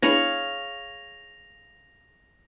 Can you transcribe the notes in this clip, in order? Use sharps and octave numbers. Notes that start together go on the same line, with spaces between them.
B3 D4 E4 G#4 C#5 F5 A#6 F7